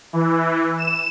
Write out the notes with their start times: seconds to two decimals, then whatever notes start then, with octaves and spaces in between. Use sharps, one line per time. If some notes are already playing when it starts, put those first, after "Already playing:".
0.13 E3
0.78 E7